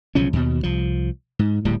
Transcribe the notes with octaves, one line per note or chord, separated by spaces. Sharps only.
B1 C#3 F3 C#4
D#2 B2
C2 F3
G#2
D1 A2 G3